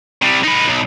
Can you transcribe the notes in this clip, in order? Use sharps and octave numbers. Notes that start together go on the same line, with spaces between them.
C3 G3
D#4 B4
B1